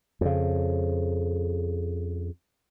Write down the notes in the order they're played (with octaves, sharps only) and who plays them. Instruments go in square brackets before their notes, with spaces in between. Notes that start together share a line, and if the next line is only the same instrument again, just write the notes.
[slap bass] F2 C#3